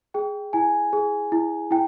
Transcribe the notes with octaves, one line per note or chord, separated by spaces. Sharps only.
G#4 G5
E4 G#5
G#4
E4
E4 G5